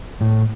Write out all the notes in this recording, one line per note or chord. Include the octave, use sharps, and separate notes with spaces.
A2